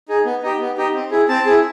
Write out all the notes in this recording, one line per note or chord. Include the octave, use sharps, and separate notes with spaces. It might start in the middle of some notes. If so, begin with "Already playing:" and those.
D#4 G#4
B3
D#4 G4
B3
D#4 G4
C4
E4 G#4
C4 A5
E4 G#4